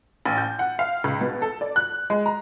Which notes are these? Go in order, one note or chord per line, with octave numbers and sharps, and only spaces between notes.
A1
G6
F#5
F5
C#2
B2
A4
D5
F#6
G#3
A#5